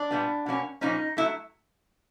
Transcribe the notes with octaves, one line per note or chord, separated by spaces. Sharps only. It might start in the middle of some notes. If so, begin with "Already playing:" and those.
Already playing: D4
A#2 G3 B3
B2 F#3 A#3 C#4
A#2 F3 A#3 C#4 D#4
F#3 A3 E4